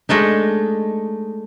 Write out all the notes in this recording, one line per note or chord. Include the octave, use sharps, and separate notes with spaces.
G#3 A3 D4 D#4